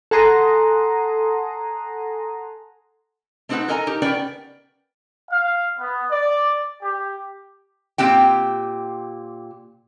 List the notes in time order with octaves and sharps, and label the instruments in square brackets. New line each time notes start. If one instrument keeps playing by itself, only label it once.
[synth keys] A4 F#5 G#5 A#5 C6 D#6
[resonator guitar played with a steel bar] A3 C4 D#4 G#4 B4 F#5
A4 A#4 D#5 G#5 A#5
D#4 G4 A#4
B3 C#4 A#4 B4 D5 G5
[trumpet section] F5
B3
D5
G4
[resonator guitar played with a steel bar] A#2 C4 G4 G5